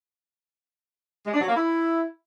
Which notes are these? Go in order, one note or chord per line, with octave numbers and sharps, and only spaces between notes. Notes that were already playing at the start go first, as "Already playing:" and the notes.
G#3
D4
F#3
A#3
E4